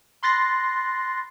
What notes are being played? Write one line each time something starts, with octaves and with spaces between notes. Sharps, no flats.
B5 C6 F#6 A6 A#6 C7